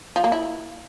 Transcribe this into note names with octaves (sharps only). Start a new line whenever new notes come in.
F3
A#3
E4